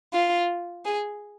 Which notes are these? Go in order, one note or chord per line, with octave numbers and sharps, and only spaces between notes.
F4
G#4